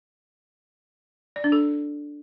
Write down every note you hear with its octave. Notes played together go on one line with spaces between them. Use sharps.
D5
D4
A4